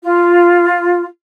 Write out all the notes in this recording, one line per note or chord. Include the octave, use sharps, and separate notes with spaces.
F4